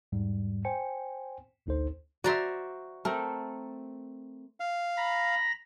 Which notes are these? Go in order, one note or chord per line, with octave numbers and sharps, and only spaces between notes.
E2 G#2 G3
C5 G5 G#5 C#7
A1 D2 D#4 A4 C5
F#4 C5 D5 E5 A#5 C6
A3 C4 A4 A#4
F5
A#5 B5 A#6